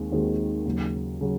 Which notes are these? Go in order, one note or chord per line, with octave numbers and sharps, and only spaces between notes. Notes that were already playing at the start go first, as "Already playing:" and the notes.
Already playing: D#2 D#3 G#3 C4
D#2 D#3 G#3 C4 F#4
D#2 C#3 F#3
C#3 F#3